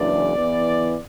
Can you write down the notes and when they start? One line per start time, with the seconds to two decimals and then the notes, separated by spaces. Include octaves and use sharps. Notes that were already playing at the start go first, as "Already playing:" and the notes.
Already playing: F#1 E2 E3 D4 D5
0.36 E2 E3 B3